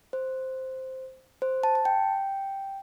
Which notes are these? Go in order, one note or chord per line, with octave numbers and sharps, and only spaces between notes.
C5
C5
A5
A5
G5